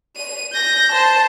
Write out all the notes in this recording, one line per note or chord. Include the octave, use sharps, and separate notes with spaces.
D#7
G6 A#6
C5 A5